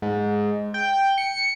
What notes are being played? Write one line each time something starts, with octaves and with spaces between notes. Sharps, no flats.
G#2
G5
C#7